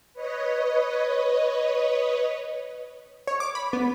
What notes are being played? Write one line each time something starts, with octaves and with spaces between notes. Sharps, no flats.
B4 C#5 D#5
C#5
D6
B5
B3